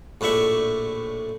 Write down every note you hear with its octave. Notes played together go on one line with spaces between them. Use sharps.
A#1 A2 D4 E5 C#6